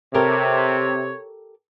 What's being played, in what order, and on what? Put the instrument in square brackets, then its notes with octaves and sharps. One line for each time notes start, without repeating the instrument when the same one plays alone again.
[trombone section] C3 [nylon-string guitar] G4 A4 A#4 [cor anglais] C#5